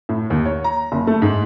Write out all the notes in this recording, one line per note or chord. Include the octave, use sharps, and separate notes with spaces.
A2
D#2
C#5
A#5
F#1
A3
G#2